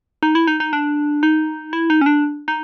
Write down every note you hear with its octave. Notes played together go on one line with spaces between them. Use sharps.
D#4
E4
D#4
D#4
D4
D#4
E4
D#4
C#4
D4
D#4